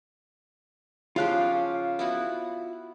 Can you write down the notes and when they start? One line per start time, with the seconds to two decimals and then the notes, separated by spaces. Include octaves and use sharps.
1.16 C#3 F3 F4 G4 F5 F#6
1.99 B3 E4 F#4